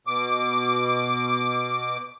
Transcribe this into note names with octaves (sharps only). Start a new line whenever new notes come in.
B2 D6